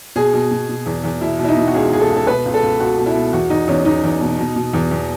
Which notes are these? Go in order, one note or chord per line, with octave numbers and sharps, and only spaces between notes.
B2 G#4
B2
B2
B2
E2
E2
B2 E4
B2
E4
D#4
B2
F#4
C#2 G#4
C#2 G#4
A4
C#2
A4
B2 B4
C#2
A4
C#2
C#2 F#4
B2
E4
B2
E2 F#4
E2 D#4
E2 C#4
E2 D#4
E2
B2
B2
B2
E2
E2